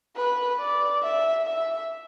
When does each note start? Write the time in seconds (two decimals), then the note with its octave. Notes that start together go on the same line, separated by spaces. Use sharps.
0.16 B4
0.59 D5
1.03 E5
1.46 E5